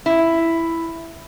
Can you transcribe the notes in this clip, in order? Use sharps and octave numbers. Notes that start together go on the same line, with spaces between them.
E4